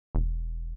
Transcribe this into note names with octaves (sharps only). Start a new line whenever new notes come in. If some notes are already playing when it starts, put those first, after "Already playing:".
E1